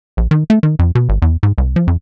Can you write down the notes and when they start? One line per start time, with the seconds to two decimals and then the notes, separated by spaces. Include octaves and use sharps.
0.17 A#1
0.31 D#3
0.50 A3
0.63 D#3
0.79 F2
0.95 B2
1.09 G#1
1.22 E2
1.43 G#2
1.58 C2
1.76 F3
1.87 F2